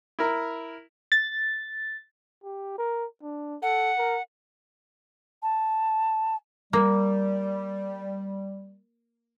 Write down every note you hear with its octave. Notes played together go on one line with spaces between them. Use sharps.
E4 A#4 A#5
A6
G4
A#4
D4
A4 F#5
A#4
A5
G3 A#3